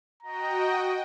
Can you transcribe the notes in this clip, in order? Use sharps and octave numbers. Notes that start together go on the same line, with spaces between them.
F#4 D#5 G5 A#5